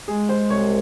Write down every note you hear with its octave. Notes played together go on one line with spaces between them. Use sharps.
G#3 G#4
C5
C2 C#5